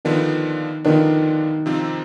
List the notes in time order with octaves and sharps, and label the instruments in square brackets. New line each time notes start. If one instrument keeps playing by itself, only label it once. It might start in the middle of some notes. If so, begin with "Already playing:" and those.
[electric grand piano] D3 F3 B3 D4 [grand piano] D#3
[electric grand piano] D3 F3 B3 D4 [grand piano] D#3
[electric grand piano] C3 F3 C4 D#4